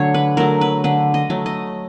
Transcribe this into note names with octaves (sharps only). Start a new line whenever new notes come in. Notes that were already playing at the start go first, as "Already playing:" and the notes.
Already playing: D3 F#3 A3 C#5
B4
F#3 A3 A#4
B4
D3 B4
D#5
F#3 A3
D#5